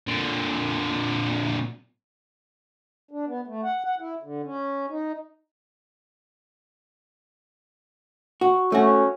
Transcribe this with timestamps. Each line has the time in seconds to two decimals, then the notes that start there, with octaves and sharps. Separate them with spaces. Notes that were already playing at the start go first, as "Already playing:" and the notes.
0.07 A#2 D3
3.11 D4
3.27 B3
3.47 A3
3.64 F#5
3.84 F#5
4.00 E4
4.23 D3
4.44 C#4
4.90 D#4
8.41 F#4
8.72 A3 C#4 F#4